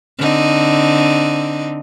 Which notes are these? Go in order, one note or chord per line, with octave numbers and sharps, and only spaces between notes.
D3 C4 D#4